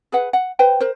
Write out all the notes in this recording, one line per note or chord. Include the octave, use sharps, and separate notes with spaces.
G#4 B4 F#5
F#5
B4 C5 G5
A#4 C5